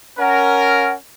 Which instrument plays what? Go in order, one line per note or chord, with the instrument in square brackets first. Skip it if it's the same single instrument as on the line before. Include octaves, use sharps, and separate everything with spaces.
[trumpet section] C#4 A#4 [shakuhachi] F#5